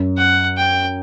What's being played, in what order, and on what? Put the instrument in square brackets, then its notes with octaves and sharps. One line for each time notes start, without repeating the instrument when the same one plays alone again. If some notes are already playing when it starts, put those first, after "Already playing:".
Already playing: [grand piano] F#2
[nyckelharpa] F#5
G5